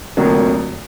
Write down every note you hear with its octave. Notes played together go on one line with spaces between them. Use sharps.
F1 F2 D3 F#3 A#3